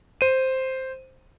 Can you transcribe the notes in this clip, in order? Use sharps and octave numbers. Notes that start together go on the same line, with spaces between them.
C5 D#7